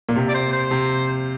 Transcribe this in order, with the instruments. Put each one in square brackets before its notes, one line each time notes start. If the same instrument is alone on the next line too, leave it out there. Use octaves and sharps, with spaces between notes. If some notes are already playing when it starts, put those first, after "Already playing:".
[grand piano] A#2
C3
[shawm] D5
C5
C5
[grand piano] C3